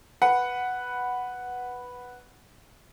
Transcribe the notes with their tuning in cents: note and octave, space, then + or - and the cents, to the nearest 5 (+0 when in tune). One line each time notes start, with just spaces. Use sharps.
B4 +0 F#5 +0